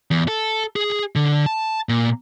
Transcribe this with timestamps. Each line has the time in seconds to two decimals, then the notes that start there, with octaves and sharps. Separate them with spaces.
0.11 E2
0.28 A4
0.76 G#4
1.16 D3
1.46 A5
1.89 A#2